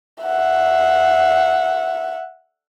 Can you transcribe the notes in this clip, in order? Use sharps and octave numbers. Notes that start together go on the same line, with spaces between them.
E5 F#5